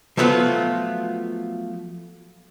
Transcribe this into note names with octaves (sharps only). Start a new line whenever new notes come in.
F3 F#3 A3 B3 F4 F#4